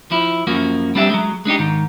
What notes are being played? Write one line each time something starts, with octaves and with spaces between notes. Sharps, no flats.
F3 E4
F#2 F3 A#3 F#4
G3 C4 D4 G4 E5
F#3 G#3
G#3 D4 D#4 G4
G#2 D#3